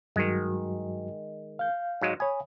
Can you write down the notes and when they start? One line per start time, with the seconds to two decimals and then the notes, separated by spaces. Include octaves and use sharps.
0.16 G2 D#3 F#3 G#3 F#4
1.59 F5 G6
2.02 G#2 F#3 G#3
2.20 C#5 G#5 B5 D#6